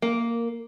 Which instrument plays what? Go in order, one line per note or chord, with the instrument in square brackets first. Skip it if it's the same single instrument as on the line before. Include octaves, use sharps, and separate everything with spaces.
[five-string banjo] A#3